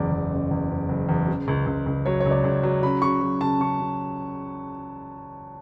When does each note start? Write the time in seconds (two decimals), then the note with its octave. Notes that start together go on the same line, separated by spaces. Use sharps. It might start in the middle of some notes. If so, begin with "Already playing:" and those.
Already playing: F#1 E2 D5
0.12 E2
0.32 F#1
0.51 E2
0.70 F#1
0.89 F#1
1.09 E2
1.28 C#3
1.48 C#2
1.66 C#2
1.86 C#2
2.05 F#3 C#5
2.20 C#5
2.26 C#2
2.31 D5
2.44 C#2
2.63 F#3
2.83 C#3 B5
3.02 C#3 C#6
3.21 F#3
3.41 C#3 A5
3.60 C#3 C#6
3.79 C#3